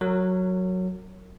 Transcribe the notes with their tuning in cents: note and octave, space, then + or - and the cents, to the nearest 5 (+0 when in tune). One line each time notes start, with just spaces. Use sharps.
F#3 +0 A#4 -35